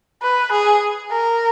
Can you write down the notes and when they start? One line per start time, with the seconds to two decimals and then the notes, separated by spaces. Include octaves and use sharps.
0.22 B4
0.52 G#4
1.11 A#4